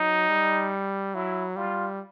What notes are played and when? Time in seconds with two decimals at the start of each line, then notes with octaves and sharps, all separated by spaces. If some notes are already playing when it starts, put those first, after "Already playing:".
Already playing: F#3 D#4
0.29 G3
1.15 F#3 E4
1.56 G3 F4